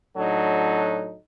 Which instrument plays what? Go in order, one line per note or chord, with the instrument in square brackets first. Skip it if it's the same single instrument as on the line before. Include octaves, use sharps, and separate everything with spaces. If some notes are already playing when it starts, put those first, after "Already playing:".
[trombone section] A2 F#3 D4 D#4 F#4 A4